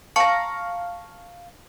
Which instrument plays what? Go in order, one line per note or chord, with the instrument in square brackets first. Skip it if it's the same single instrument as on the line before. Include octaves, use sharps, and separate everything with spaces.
[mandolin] F5 A#5 [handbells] A5 C#6 C#7